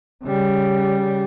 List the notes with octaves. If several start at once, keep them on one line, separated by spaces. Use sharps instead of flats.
C#3 G3